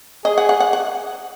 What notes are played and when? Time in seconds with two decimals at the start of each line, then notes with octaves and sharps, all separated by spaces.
0.25 G#4 D#5
0.38 F#5
0.49 F#5
0.60 F#5
0.73 F#5